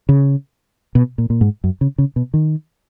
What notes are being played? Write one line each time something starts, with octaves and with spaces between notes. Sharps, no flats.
C#3
B2
A#2
A#2
G#2
F#2
C#3
C#3
B2
D#3